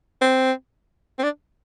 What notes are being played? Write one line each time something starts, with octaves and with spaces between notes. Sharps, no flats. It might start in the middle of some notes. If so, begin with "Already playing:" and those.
C4
C4
D4